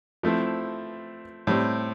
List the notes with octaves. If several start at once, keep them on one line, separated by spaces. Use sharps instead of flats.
F3 A3 C4 E4
A2 G3 C4